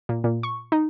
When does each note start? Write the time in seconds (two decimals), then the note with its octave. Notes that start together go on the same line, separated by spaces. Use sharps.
0.09 A#2
0.24 A#2
0.43 C#6
0.72 D#4